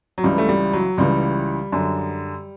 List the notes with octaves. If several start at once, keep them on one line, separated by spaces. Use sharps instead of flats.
F#3
C#2 C#3 E3 G3
A3
G3
F#3
C#2 C#3 E3 G3
F#2 D3